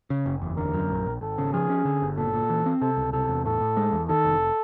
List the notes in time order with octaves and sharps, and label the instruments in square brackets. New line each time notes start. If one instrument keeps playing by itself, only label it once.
[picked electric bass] C#3
F#1
E2
[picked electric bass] D3 [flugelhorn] A#4
[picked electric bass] F#2
A#1
A#1
[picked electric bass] G#1 [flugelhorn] A4
[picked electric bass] C#3
[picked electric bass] F3 [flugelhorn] G#4
[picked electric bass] C#4
D3
G1
[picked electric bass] A#2 [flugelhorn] A4
[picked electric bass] A#2
E3
C4
[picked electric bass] C3 [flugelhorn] A4
[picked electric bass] C#2
[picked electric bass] C3 [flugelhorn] A4
[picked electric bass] E2
[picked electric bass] A2 [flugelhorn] A4
[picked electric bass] A2
G#3
E2
[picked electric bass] D#3 [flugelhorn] A4
[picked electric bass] F1